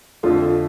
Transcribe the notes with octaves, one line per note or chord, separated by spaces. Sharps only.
F2 D3 F3 A3 F4